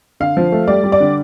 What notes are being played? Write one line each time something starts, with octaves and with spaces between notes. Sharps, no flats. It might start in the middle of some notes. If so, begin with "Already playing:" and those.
D3 F5
F3
A3
G3 D5
G3
D5
D3